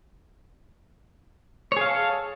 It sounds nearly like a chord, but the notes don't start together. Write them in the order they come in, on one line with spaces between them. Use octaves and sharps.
C#5 G#4 F5 A4